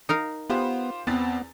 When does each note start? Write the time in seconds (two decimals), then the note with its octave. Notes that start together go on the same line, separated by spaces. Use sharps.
0.09 D#4 A#4 F5
0.50 B3 F4 G4 C5
1.07 E2 B3 C4 A6